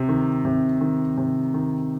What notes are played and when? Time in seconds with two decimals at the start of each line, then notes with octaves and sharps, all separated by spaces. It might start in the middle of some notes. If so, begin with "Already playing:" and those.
Already playing: C3
0.09 D#3
0.45 C3
0.81 D#3
1.17 C3
1.54 D#3